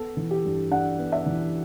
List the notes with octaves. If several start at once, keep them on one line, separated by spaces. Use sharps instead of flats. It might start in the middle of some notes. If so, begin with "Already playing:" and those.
Already playing: B3 A4
E3
G4
G2
D4 F#5
B3
E5
E3